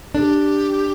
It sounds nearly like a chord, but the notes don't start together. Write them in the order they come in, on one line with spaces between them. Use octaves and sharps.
D4 A4 G4